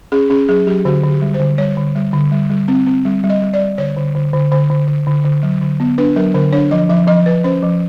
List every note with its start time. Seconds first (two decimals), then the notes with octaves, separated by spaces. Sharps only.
0.12 C#4 G#4
0.30 C#4 G#4
0.49 F#3 G#4
0.67 F#3 G4
0.85 D3 F#4
1.03 D3
1.10 G4
1.22 G3
1.34 C5
1.40 D3
1.58 G3 C#5
1.77 D3
1.95 G3
2.14 D3
2.32 G3
2.50 G3
2.68 C4
2.87 C4
3.05 G3
3.24 G3
3.30 D#5
3.42 G3
3.54 D5
3.59 G3
3.78 D3 C#5
3.97 D3
4.15 D3
4.33 D3
4.51 D3 C5
4.70 D3
4.88 D3
5.07 D3
5.25 D3
5.43 F#3
5.61 D3
5.80 B3
5.98 D4 B4
6.16 F#3 A#4
6.34 D3 A#4
6.53 D4 C#5
6.71 F3 D#5
6.89 F3 E5
7.07 F3 D#5
7.26 F3 B4
7.44 C#4 C5
7.63 F3